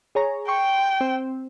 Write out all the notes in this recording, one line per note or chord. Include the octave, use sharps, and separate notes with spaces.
G#4 C#5 A#5
G5 C6 C#6
C4